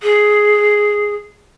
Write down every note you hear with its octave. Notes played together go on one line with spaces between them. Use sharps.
G#4